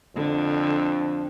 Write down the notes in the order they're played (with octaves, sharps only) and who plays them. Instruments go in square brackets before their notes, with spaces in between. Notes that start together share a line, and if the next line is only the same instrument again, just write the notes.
[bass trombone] F2 [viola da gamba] D3